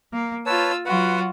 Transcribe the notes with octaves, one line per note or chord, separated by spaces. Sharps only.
A#3
F4 B4 C#5 A5 E6
F#3 F4 F#4 B4 F#5